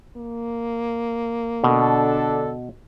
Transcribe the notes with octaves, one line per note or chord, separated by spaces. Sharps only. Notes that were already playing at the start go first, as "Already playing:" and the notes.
A#3
B2 D3 D4 A4